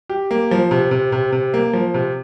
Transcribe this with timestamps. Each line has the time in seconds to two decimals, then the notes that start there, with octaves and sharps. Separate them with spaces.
0.09 G4
0.31 A#3
0.51 F3
0.71 C3
0.91 C3
1.12 C3
1.32 C3
1.54 A#3
1.73 F3
1.94 C3